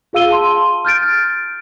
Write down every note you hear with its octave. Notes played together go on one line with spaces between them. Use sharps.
F4 G#4 F5 E6 D#7 G7
A5 C6
F6 G6 A6 D7